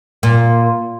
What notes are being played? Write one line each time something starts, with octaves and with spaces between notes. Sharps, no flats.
A#2